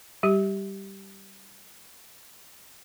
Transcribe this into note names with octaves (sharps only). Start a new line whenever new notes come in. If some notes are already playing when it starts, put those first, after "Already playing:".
G3 G4